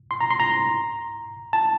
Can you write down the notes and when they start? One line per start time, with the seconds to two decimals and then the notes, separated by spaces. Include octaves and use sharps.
0.11 C6
0.21 A#5
0.30 C6
0.40 A#5
1.53 A5